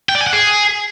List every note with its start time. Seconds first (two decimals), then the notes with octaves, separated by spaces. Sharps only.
0.09 G5
0.15 D5
0.21 G#5
0.27 F#5
0.33 G#4